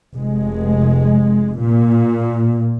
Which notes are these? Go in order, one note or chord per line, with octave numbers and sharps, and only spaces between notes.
F1 G#3
A#2